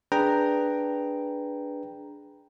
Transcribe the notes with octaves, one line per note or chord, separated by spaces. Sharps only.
D4 G#4 B4 G5 A#5